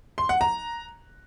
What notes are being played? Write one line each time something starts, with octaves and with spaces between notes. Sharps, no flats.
C6
F#5
A#5